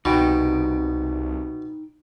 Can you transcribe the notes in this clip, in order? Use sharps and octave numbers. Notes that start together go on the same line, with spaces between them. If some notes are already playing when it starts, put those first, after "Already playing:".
C2 B2 D#4 G5